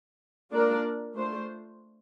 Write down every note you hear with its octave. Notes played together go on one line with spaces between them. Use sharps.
A#3 D4 F4 A#4 D5
A3 D4 F4 C5